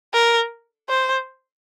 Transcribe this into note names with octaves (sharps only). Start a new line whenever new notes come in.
A#4
C5